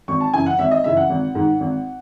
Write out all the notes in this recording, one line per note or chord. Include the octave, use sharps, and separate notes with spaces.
G#1 C#6
A5
F#2 C#3 E3 G#5
F#5
G#1 E5
D#5
F#2 C#3 E3 E5
F#5
G#1
G#2 D#3
G#1